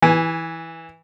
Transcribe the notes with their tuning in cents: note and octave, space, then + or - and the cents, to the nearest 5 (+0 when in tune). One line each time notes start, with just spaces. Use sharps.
E3 -10 G#5 +0